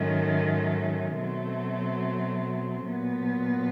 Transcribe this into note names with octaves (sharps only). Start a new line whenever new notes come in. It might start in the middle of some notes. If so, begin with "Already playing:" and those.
Already playing: G#2 D#3 F#3 A3 C#4
B2 F#3 A3 C4
A#2 F#3 B3